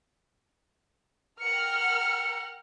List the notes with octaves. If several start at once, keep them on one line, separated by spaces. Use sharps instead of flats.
A#4 F#5 G5 F6 C#7